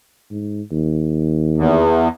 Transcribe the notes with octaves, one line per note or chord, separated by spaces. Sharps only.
G#2
D#2
E2